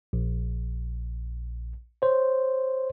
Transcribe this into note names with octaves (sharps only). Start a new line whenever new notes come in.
A#1
C5 C#5